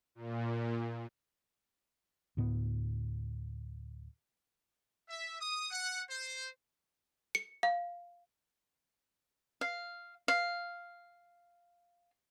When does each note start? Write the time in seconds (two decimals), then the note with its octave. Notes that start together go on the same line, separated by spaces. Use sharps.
0.15 A#2
2.37 D2 A2 B3
5.09 E5
5.40 D#6
5.71 F#5
6.10 C5
7.35 C#7
7.63 F5
9.61 F5
10.28 F5